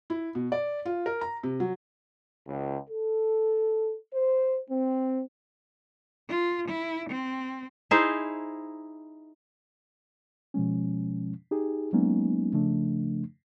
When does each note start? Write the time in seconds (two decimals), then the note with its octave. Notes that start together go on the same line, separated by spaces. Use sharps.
0.10 E4
0.35 B2
0.52 D5
0.85 F4
1.06 A#4
1.21 A#5
1.43 C3
1.60 F#3
2.47 C#2
2.89 A4
4.14 C5
4.70 C4
6.29 F4
6.68 E4
7.10 C4
7.91 D#4 E4 G#4 C5
10.54 B2 F3 G#3 C#4
11.51 D#4 G4 G#4
11.93 F#3 G#3 A#3 B3 C#4 D#4
12.53 C#3 F3 A3 D4